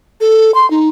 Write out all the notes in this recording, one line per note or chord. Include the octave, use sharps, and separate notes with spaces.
A4
C6
D#4